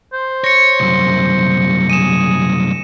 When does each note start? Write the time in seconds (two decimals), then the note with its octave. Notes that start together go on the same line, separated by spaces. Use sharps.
0.13 C5
0.44 C#5 A#6 C#7
0.80 C2 F#2
1.90 G#4 D#7 E7